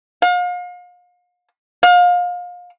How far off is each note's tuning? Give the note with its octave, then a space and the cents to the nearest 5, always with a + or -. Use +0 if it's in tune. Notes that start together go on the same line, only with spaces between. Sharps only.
F5 +40
F5 +30